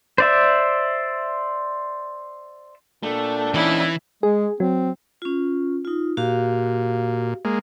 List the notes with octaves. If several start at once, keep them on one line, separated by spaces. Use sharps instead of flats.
C5 D5 E5
A#2 A3 D4 G5
E3 C#4 D#4 E4
G#3 G#4
F#3 C4
C#4 F4
D#4 F4
A#2 F#4 G4 F5
G#3 A#3